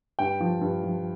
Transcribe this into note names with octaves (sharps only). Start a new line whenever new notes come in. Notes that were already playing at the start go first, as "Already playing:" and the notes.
G2 G5
F3
G2
F3